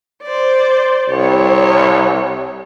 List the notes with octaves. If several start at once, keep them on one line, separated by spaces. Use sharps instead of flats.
C5 D5
C2 C#5